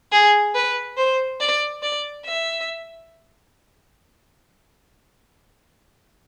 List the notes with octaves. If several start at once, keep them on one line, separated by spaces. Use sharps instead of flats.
G#4
B4
C5
D5
D5
E5